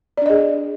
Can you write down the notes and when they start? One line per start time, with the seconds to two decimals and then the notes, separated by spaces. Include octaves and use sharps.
0.17 D5
0.22 D4
0.26 D#5
0.30 G#4